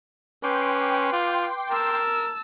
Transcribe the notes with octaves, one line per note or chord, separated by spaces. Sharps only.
C#4 B4 G5 C6 D6
F4
A#4 A5 E6